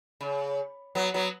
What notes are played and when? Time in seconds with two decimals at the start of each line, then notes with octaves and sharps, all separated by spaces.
0.21 C#3
0.95 F#3 B3
1.14 F#3 B3